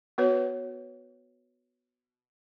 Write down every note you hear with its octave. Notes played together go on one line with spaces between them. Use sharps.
B3 F#4 B4 C#5